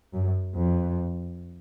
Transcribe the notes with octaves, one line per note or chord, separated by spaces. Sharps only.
F#2
F2